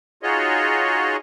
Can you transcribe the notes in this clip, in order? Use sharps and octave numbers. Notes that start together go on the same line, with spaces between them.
D#4 F4 F#4 G#4 C#5 D#5